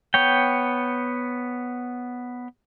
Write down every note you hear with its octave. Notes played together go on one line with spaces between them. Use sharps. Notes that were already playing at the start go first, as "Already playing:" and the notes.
B3 C#5 G5